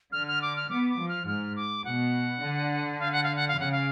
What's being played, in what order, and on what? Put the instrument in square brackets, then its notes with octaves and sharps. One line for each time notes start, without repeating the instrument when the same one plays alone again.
[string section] D3 [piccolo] F6
[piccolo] F6
D6
F6
[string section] B3 [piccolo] D6
[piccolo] D6
[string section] F3
[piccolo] F6
[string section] G#2 [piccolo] F6
[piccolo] D6
[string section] B2 [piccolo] F#5
[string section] D3
[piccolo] F5
F#5
F5
F#5
F5
[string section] C#3 [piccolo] F#5
[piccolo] F5